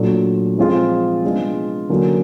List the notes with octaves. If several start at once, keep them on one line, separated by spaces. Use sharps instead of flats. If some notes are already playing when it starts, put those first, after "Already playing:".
Already playing: A#2 F#3 A3 D4
F3 G#3 C4 F4 G#4
G#3 B3 D4 F4 G#4
D3 F#3 A#3 C#4